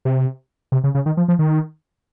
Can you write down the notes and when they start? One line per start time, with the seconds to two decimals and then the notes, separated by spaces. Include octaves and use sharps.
0.05 C3
0.72 C3
0.84 C#3
0.95 C#3
1.06 D#3
1.17 F3
1.28 F3
1.39 D#3